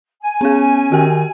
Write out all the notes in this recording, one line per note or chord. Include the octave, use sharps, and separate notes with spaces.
G#5
B3 C#4 G#4
D#3 F#4 G4 G5